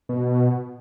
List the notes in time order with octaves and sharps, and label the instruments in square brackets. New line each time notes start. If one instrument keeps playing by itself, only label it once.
[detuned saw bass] B2